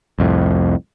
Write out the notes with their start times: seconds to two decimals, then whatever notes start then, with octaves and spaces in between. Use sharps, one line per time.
0.19 C2 F2 A2